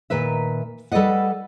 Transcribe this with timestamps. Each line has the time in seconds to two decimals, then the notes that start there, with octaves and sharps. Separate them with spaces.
0.10 A#2 D#3 B4 E5
0.92 G3 A4 B4 D5 D#5 F#5